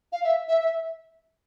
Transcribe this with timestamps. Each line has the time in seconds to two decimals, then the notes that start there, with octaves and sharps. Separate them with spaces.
0.12 F5
0.24 E5
0.48 E5
0.61 E5